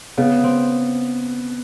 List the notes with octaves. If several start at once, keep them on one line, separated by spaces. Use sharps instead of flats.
C#3 B3
C4